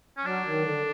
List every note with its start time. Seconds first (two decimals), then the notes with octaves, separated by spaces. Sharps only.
0.17 C#4
0.25 F#3 D4
0.45 D#3
0.64 D3